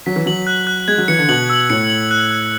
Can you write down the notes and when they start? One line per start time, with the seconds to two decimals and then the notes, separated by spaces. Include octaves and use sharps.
0.06 F#3 B6
0.16 E3
0.26 F#3 F#7
0.47 F#6
0.67 F#6
0.88 G#3 G#6
0.98 F#3
1.08 E3 C#7
1.19 D3
1.29 B2 F#7
1.50 E6
1.70 A2 C#7
1.90 F#7
2.11 F#6
2.31 F#6